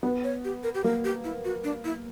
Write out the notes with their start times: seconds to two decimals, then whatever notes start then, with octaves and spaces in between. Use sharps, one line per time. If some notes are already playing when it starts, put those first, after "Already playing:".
0.03 B3 B4
0.24 C#5
0.44 G4
0.63 A#4
0.74 G4
0.84 A#3 A#4
1.04 G4
1.24 E4
1.45 F#4
1.64 D4
1.85 E4